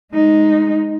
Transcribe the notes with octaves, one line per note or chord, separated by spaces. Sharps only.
G#3 D#4